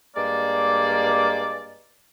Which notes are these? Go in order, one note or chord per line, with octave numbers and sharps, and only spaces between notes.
G2 G#3 A#3 D5